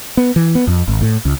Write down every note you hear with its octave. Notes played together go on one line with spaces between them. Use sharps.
B3
E3
B3
F2
G#1
A2
C#2